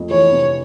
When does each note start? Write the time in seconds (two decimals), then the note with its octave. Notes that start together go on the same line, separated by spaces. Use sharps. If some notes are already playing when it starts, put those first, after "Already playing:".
Already playing: F2 A3
0.10 E3 C#5
0.32 C3